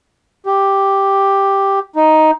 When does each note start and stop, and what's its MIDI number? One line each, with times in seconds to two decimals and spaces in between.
0.46 1.79 67
1.96 2.31 63